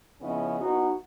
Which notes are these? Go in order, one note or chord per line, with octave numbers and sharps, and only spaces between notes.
C#3 F3 B3 C#4 E4 D#5
B3 D#4 E4 F#4